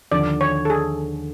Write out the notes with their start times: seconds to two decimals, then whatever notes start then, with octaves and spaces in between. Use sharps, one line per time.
0.12 D#2 D3 F3 D5
0.41 C#5
0.65 A4
0.70 G#4